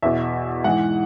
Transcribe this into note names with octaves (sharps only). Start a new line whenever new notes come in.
E2 B2 E5
G#2 E3 F#5